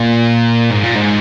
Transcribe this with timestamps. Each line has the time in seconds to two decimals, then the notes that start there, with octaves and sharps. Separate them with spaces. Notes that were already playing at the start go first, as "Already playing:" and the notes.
Already playing: A#2
0.71 G#2
0.84 A#2
0.96 G#2